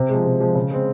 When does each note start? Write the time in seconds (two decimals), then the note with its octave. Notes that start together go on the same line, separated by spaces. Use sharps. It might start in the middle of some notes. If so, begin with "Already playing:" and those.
Already playing: C3
0.09 F3 G#3
0.25 C3
0.40 F3 G#3
0.55 C#3
0.71 G#3 C4